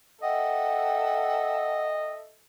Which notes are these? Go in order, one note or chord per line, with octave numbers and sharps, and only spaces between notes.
A4 D#5 E5 F#5 G5